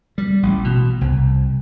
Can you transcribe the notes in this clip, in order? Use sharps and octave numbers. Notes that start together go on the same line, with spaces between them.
G3
A1
B2
C2